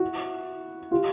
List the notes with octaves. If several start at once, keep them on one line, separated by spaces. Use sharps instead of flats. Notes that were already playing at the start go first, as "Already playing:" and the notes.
Already playing: E4 F#4
F4 G4